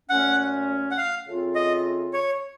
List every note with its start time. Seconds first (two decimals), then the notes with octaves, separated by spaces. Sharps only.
0.10 A#2 F#3 A3 C#4 F#5
0.91 F#5
0.97 F5
1.26 C#3 A3 C4 F4
1.55 D#5
2.13 C#5